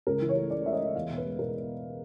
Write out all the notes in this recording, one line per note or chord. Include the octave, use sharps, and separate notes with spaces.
C#2 A#4
E3
C#5
A3
A3 D5
E3 E5
D#5
E3
E2 F5
B2
B4
G#3
B2 A#4